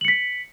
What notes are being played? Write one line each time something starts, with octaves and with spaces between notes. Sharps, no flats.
B6 C#7 F#7